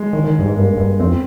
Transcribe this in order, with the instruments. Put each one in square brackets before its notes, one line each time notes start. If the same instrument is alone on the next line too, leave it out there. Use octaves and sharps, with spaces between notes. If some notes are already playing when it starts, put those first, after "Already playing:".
Already playing: [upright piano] G#3
[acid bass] D#3
D#3
G2
G#2
[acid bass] G2 [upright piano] A#3
[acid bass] G2
[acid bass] F2 [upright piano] C4